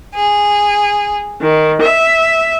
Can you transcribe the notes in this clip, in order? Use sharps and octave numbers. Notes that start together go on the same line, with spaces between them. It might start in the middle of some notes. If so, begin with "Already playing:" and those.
G#4
D#3
E5